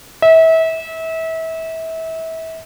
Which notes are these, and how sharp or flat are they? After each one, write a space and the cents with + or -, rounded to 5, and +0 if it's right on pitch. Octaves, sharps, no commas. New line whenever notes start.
E5 -30